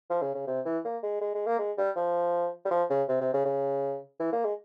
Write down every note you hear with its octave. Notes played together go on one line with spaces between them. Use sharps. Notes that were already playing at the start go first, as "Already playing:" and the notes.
F3
C#3
C#3
C3
E3
A#3
G#3
G#3
G#3
A#3
G#3
G3
F3
G3
F3
C#3
C3
C3
C#3
C#3
E3
A#3
G#3